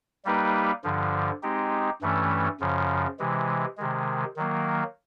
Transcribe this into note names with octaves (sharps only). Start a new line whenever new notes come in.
G3 A#3 D#4 G4 B4
G2 D3 F3
G#3 C4 D#4 G4
G2 E3 A3 C#4
F#2 C#3 F3
C3 E3 G#3
C3 D#3 G#3
D#3 F#3 A#3